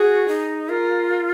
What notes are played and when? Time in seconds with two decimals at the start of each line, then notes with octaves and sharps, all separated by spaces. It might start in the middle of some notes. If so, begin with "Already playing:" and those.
Already playing: F#4 G#4
0.28 D#4
0.69 F4 A#4